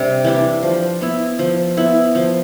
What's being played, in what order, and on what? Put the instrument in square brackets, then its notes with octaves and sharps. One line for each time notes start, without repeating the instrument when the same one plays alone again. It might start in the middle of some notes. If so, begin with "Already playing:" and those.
Already playing: [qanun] C3 G3 D4
E3 G3 D4
F3
B3 E4
F3
B3 E4
F3